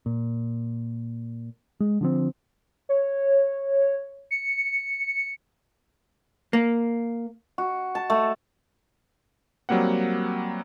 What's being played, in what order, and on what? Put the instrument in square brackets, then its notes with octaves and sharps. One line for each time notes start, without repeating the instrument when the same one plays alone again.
[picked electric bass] A#2
G#3
D3 F3 C4
[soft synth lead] C#5
C#7
[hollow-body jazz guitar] A#3
[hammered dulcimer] F#4
A5
A3
[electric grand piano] F#3 G3 A#3 C4 F#5